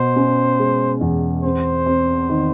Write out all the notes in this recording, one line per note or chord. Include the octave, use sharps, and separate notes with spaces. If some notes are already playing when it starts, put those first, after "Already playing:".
Already playing: B2 C5
C#4
G#3
E2
C4 C5
C4
D#3